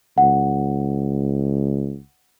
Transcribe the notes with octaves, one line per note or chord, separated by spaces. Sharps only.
C#2 F#5